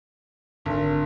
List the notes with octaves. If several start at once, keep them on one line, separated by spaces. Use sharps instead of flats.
G#1 D3